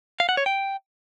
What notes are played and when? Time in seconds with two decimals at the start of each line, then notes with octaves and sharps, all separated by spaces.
0.20 F5
0.29 F#5
0.37 C#5
0.46 G5